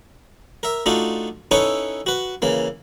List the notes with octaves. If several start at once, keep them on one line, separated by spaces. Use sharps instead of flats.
A#4 E5
A3 D4 D#4 F4 F#4
C#4 D#4 E4 A4 B4 C#5
F#4 B4
C#3 E3 A#3